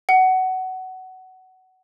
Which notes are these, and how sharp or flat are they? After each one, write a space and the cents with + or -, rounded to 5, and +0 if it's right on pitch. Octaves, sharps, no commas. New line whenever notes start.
F#5 +20